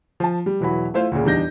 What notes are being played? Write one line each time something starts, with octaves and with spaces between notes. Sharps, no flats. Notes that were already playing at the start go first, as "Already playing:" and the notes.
F3 A5
G3
E1 E3 F#3 B5
A3 E4 F4 C5 F5
D2 A#2 C#3
E2 G3 D4 D#4 G6 A#6